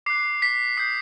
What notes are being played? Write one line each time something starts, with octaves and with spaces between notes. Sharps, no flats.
D6 F#6 C7
B6
D#6 G6 C7